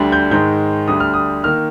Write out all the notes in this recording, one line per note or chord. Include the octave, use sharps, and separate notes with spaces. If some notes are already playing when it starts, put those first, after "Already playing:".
Already playing: D2 D3 G3
G6
G#2 D#3 G#3 G6
D2 D3 G3 D#6
F6
D#6
D#3 A#3 F6